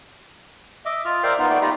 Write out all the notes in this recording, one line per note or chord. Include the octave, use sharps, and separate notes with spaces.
D#5 E5 D6
F4 F6
A#4 C5 D5 E5 F5 G5
B3 D#4 F4
A3 B3 D5 G5
D#4 F4 G4 A#5 B5